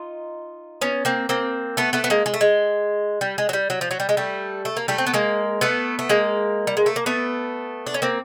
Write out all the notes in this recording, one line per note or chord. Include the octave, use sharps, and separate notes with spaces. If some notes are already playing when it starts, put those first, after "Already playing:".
Already playing: D#4 F4
B3 C#4
A#3 C4
A#3 C4
A3 B3
A3 B3
B3
G#3 A#3
G#3
A3
G#3
G3
G#3
F#3
G3
F#3
F3
F#3
G3
G#3
G3 A3
A3
A#3
G3 A3
C4
B3
G#3 A#3
A3 B3
A3
G#3 A#3
G3
G#3
A3
A#3
A3 B3
D4
C#4
A#3 C4